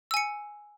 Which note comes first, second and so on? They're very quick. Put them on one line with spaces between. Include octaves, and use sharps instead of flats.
E6 G#5 C#7